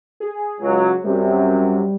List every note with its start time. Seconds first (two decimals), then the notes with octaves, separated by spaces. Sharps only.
0.20 G#4
0.61 C#2 F#3
1.04 F#2 C3 G3